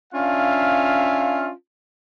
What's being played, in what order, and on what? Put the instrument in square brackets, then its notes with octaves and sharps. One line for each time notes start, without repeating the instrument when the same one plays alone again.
[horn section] C#4 D4 F4 E5 F5